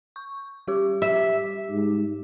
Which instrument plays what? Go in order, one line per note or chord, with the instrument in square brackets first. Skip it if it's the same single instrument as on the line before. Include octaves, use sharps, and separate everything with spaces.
[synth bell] C#6
G3 G4 D6
[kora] E5
[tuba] G#2